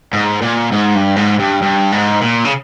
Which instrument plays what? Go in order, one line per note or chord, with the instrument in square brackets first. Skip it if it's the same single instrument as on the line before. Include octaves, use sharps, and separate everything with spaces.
[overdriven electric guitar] G#2
A#2
G#2
G2
G#2
G2
G2
G#2
A#2
C#3